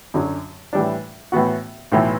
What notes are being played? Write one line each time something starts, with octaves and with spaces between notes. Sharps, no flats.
F#2 D3 F#3
A2 E3 G3 D4
A2 E3 B3 F#4
B1 A2 E3